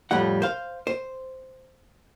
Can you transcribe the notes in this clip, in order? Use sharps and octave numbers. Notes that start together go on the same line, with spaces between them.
F2 A2 G3 F#5
C5 F5
C5